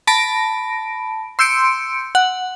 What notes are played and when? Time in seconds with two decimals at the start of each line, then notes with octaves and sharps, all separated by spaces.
0.07 A5 B5 A#6 D7
1.39 C6 E6 G6 C#7 D7
2.15 F#5